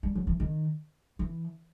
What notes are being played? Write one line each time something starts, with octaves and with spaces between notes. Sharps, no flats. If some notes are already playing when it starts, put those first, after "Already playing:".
G3
F#3
E3
D#3
E3